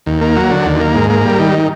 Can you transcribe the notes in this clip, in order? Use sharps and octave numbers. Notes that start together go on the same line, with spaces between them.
D#2
A#3
F#3
D3
D#2
A#3
G#2
A#3
G3
D#3